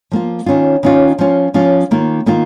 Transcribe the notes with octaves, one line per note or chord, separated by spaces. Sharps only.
F3 A#3 F4
D#3 C#4 F4
D#3 C#4 F4
F3 C#4 F4
F3 C#4 F4
D#3 A#3 F4
D#3 A#3 F4